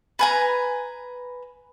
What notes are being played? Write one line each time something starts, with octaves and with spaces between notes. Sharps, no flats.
B4 G#5 A#5